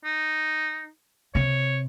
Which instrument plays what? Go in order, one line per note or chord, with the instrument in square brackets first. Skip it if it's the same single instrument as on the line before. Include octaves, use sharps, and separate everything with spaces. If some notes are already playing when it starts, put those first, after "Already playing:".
[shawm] D#4
[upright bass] C3 [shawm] C#5